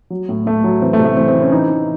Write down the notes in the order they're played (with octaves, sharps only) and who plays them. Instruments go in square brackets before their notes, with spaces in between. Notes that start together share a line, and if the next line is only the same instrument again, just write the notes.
[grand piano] F#3
A2
A2 A3
F#3
E3 C4
A3
C3
A3
E3 C4
C4
E3
C#4
E3 D#4
E3